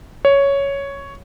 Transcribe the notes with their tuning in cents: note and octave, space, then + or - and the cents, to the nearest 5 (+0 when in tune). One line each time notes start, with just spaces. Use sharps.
C#5 +5